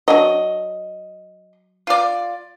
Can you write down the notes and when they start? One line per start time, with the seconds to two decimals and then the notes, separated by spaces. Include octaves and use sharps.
0.08 F#3 D4 D#5
1.87 F4 D5